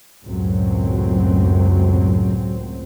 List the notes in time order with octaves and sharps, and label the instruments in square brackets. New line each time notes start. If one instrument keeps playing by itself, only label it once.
[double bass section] C#2 F#2 A2 F#3 C4